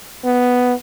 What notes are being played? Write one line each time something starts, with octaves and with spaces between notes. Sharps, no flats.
B3